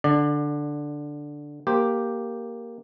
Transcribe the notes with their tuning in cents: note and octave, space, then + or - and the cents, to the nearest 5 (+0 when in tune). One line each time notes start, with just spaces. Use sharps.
D3 +0 D5 +25
A#3 +0 G4 +0 C5 +0